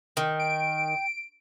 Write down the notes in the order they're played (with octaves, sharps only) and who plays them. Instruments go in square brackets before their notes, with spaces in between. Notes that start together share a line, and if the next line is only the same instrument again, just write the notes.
[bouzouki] D#3 [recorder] G5
[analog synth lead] D7